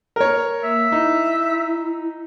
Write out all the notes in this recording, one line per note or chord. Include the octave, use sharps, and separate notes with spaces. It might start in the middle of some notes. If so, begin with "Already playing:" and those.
A#4 C#5
A#3 E5
D#4 E4